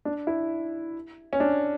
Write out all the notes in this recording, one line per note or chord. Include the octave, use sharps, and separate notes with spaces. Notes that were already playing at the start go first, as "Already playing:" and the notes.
D4
E4
C#4
D4